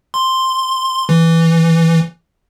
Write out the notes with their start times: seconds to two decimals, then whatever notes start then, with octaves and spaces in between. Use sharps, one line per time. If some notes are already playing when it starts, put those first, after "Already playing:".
0.14 C6
1.09 E3